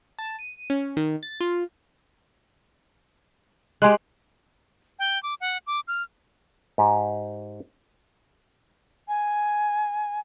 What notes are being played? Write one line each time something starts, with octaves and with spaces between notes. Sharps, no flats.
A5
D#7
C#4
D#3
A6
F4
G#3 G4 G#5 C6 F#6
G5
D6
F#5
D6
F6
G#2 G4
G#5